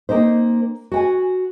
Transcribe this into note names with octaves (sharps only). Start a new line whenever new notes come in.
A#3 C4 D#4 C5
F#4 G5 G#5